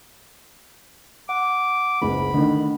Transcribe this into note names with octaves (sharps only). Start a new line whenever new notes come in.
F#5 D6
F#1 C#2 B5
D3 D#3 A3